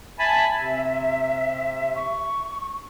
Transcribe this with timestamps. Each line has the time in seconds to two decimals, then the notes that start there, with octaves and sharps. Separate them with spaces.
0.19 E5 G#5 A5 B5
0.58 C3
1.96 C#6